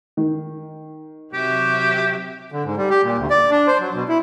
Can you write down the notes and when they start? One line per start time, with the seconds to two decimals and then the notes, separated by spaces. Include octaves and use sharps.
0.17 D#3
1.33 C3 F#3 G4 E5
2.52 D3
2.64 G#2
2.77 G3
2.90 G4
3.03 A#2
3.18 D2
3.30 D5
3.51 D4
3.67 C5
3.80 F#3
3.95 B2
4.08 E4